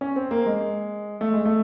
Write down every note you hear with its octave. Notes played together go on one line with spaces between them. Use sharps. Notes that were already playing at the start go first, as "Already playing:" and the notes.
C#4
C4
A#3
G#3
A3
G#3
A3